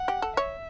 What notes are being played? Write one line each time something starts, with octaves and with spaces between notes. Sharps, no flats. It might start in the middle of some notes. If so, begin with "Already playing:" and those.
Already playing: F#5
G4
A4
C#5 E5